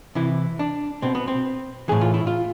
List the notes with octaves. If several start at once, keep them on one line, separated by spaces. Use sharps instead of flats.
C3 E3 E4
D4
B2 C4
B3
C4
A2 E3 G#4
F4
E4
F4